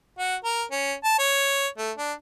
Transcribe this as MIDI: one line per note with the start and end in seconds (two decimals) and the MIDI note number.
0.19 0.36 66
0.44 0.63 70
0.71 0.93 61
1.04 1.17 81
1.19 1.67 73
1.78 1.91 57
1.97 2.12 62